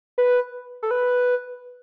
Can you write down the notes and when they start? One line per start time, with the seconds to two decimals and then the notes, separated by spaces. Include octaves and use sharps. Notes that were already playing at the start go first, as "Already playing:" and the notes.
0.18 B4
0.83 A4
0.91 B4